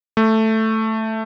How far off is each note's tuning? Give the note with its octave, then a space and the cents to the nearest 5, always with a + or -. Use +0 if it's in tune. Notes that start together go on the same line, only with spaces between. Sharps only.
A3 +5